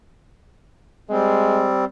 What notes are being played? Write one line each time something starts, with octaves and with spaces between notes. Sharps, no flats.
G3 G#3 C4